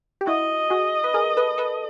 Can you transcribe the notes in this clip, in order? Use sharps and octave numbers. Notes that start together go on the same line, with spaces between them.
G4
E4 F#4 D#5
F#4 G#4
B4
G#4 A#4
A4 B4
A4 B4